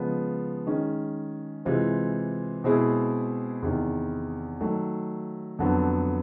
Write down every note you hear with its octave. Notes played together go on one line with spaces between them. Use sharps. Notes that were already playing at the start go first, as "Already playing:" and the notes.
Already playing: C#3 F3 G#3 B3
D#3 G#3 C#4
C3 E3 G#3 C4 F4
B2 G#3 C4 E4 G#4
E2 C3 D#3
D#3 F#3 A3
F2 D3 F#3 B3